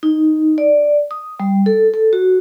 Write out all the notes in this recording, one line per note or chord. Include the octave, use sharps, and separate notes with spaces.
D#4
D5
D#6
G3
A4
A4
F#4